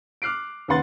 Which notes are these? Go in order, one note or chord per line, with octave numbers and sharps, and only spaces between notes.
D6 F6 F#6 C7 D7
D#2 C#3 B4 F#5 C6 A6